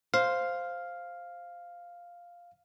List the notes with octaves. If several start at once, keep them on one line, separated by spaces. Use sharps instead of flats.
C5 F5